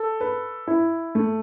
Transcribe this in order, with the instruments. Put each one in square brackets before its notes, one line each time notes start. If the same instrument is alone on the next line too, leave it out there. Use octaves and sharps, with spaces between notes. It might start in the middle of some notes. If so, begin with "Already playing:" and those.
Already playing: [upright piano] A4
B4
E4
A3